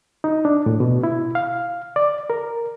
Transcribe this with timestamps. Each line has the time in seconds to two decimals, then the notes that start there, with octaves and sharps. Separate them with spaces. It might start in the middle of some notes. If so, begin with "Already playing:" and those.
0.24 D#4
0.45 D4
0.66 A2
0.80 B2
1.04 E4
1.35 F5
1.96 D5
2.30 A#4